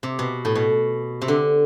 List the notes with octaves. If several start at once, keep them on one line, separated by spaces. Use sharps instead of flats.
C3
B2
A2
B2
C3
D3